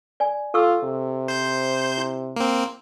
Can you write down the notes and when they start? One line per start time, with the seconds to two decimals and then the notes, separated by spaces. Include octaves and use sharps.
0.20 D5 G#5
0.54 F4 A4 C#6 E6
0.84 C3
1.28 C5 G6
1.98 E4
2.36 A#3 C4